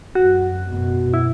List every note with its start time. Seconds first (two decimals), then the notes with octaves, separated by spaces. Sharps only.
0.15 F#2 F#4
0.70 F#2 B2
1.14 E4